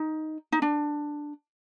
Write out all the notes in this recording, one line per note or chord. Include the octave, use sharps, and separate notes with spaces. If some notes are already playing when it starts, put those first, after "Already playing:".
Already playing: D#4
D#4
D4